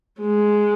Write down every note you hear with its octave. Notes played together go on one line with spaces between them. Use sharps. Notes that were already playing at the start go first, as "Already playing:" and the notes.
G#3